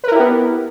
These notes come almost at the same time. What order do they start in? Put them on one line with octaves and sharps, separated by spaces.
B4 A#4 E4 G4 B3